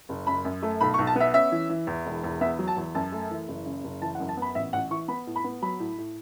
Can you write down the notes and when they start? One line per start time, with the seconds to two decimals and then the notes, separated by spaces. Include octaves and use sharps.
0.09 F#1
0.27 F#2 B5
0.45 F#2
0.63 A3
0.81 B1 B5
0.94 C#6
0.98 B1
1.07 A5
1.16 B3 E5
1.34 C#4 E5
1.52 E3
1.69 E3
1.87 E2
2.06 E1
2.24 E2
2.41 B3 E5
2.59 F#3
2.68 A5
2.77 E2
2.95 F#2 A5
3.12 A3
3.31 E3
3.48 F#1
3.66 C#3
3.84 F#1
4.02 E3 A5
4.15 F#5
4.20 F#2
4.29 A5
4.37 B3 B5
4.55 A1 E5
4.73 A1 F#5
4.91 E3 C#6
5.08 B3 B5
5.27 A2
5.36 B5
5.44 B3
5.62 F#3 B5
5.80 A2
5.98 A2